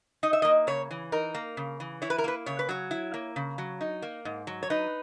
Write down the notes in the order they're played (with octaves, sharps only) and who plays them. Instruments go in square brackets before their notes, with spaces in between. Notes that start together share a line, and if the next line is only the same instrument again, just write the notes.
[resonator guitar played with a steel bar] D#4 D#5
E5
A#3 D#5
C#3 C#5
E3
D#4 A#4
A#3
C#3
E3
E4 C#5
B4
A#4
A#3 B4
C#3 C#5
B4
F#3 C#5
E4
A#3
C#3
F#3
D#4
A#3
G#2
F#3
C#5
D#4 B4